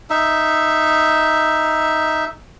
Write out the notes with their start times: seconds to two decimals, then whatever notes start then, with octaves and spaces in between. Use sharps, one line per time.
0.10 D#4 E5